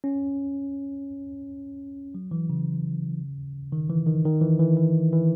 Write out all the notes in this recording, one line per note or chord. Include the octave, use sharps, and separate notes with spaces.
C#4
F#3
E3
C#3
D#3
E3
D#3
D#3
E3
E3
E3
E3